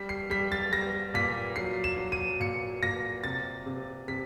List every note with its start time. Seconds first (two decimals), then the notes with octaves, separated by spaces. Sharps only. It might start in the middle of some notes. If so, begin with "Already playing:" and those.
Already playing: G3 B6
0.09 C7
0.30 G3 B6
0.52 A6
0.72 G3 A#6
1.14 A#2 B6
1.56 F#3 C7
1.84 E7
1.98 F#3
2.12 D#7
2.40 A#2 C#7
2.82 A#2 A#6
3.24 C3 A6
3.66 C3
4.08 C3 B6